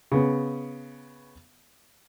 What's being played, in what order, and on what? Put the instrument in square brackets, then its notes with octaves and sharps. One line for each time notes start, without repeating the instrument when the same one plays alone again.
[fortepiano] C#3 B3